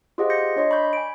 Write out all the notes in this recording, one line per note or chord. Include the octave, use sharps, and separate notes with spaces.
F4 G4 G#4 C5 D#5 F#5
G6 A#6 C#7
D4 C#5 D#5 C6
D5 B5 C#6 G6 B6
G#5 D7